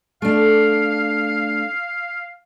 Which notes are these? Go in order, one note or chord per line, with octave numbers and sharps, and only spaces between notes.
A3 D4 F5